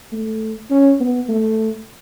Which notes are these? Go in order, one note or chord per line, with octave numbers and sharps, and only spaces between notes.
A3
C#4
B3
A3